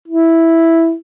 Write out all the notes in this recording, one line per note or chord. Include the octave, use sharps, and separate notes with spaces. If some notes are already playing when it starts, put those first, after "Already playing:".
E4